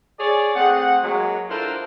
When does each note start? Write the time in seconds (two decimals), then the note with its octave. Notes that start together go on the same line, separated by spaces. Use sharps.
0.19 G#4 C#5 D5
0.54 A3 C4 G#4 F#5
1.02 F#3 G#3 A#3
1.48 D4 E4 F4 A4 A#4 C5